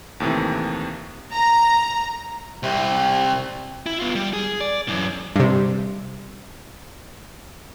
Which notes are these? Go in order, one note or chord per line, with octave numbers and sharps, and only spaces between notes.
D#2 A2 C3 E3
A#5
C2 C3
E4
B3 F4
G3
G#4
D5
F#2 E3
G2 C3